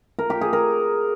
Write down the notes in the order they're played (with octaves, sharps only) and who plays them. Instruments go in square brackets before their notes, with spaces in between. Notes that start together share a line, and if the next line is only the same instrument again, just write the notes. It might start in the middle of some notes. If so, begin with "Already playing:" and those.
[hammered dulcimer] A#4
G4
G#4
A#4